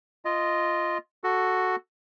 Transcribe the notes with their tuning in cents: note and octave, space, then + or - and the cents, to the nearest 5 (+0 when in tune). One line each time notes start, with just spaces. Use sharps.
F4 -10 D#5 +0
F#4 +0 A4 +0